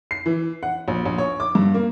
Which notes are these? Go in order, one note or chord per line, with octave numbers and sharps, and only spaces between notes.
C7
E3
F#5
A#1
A#1
C#5
D6
G2
A#3